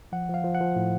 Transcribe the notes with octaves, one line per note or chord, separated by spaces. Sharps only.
F3 F#5
F3
F5
F3
F#5
F3
A2